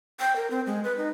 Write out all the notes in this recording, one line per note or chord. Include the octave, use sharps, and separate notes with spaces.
G5
A#4
C4
G#3
B4
D#4